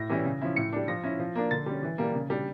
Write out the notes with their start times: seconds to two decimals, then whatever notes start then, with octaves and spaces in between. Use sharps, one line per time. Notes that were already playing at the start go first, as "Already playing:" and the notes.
Already playing: A2 A#6
0.09 E3 G3 C#4 E4
0.25 C#3
0.41 F3 C#4 E4
0.56 A2 C#7
0.73 G3 D4
0.88 F3 A#6
1.04 C#4 E4
1.20 F3
1.35 A#3 D4
1.51 D3 A6
1.66 G3 C#4
1.83 E3
1.98 G3 A#3
2.14 C#3
2.30 G3 D4